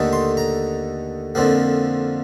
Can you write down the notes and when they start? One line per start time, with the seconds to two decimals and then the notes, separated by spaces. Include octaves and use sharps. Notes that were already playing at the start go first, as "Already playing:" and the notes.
Already playing: D#2 D3 A3 D#4
0.13 C6
0.37 A#5
1.35 F2 D3 F3 A#3